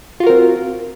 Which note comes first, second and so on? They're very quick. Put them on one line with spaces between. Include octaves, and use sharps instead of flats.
F4 F#4 A#4 C4